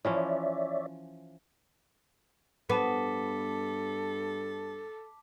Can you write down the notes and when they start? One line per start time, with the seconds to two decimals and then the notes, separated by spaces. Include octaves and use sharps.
0.05 E3 F3 C#4 C#5 D5 E5
2.70 G2 B3 A4 A5 D6 B6